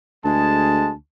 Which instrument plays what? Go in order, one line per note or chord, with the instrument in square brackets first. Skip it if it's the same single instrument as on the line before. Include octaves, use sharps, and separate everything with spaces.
[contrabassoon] D2 [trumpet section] G#3 G#4 A5